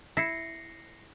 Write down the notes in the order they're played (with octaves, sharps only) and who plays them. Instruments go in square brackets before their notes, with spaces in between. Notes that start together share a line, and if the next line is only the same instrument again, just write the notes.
[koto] E4 [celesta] A#6 C7 C#7